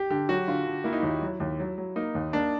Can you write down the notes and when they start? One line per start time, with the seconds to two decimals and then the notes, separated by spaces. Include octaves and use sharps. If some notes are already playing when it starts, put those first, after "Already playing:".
Already playing: G4
0.10 D3 G4
0.29 F#3 F#4
0.48 D3 F4
0.66 D3
0.84 A#3 E4
0.93 D#4
1.00 D#2 E4
1.22 F#3
1.40 D#2
1.60 F#3
1.78 F#3
1.96 A#3 D#4
2.15 D#2
2.33 A#3 D4